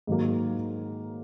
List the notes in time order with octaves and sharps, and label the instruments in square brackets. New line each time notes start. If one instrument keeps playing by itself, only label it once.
[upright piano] G#2 D#3 F#3 A#3